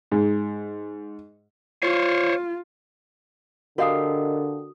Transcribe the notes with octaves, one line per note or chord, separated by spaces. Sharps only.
G#2
F4 C5 C#5
D3 D4 F#4 G4 A#4 D#5 F5 D#6